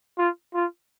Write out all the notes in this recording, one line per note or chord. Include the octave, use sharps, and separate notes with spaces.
F4
F4